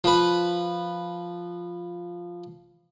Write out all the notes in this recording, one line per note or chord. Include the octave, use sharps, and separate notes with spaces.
F3 B4